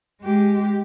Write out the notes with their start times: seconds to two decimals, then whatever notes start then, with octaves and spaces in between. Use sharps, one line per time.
0.23 G#3 G4